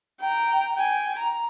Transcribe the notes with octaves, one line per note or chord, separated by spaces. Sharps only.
G5 A#5
G5 G#5
A#5